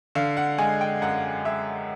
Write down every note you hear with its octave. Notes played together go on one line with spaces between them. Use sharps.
D3 F5
F#5
G#3 G#5
G5
F#2 F#5
G#3 E5